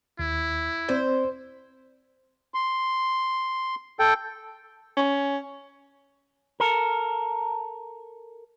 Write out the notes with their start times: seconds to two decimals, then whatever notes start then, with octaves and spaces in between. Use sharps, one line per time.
0.19 D#2 E4
0.89 C4 C5 D5
2.54 C6
3.99 A4 G5
4.97 C#4
6.60 A4 A#4